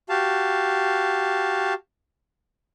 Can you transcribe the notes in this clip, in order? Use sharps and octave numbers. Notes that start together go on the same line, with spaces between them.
F#4 G4 F5 A5